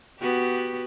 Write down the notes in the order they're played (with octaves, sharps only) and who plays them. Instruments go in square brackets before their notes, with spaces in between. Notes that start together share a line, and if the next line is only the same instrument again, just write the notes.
[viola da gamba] B3 F#4 G4